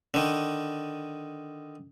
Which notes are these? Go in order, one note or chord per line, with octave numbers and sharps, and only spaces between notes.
D3 D#3